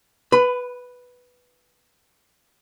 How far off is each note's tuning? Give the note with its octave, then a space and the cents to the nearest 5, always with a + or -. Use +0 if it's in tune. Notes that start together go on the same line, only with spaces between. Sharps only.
B4 +0 B5 +25